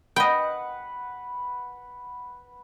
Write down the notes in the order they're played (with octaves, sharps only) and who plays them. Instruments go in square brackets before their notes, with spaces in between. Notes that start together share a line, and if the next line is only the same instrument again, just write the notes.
[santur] B4 F#5 [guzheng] D#5 G5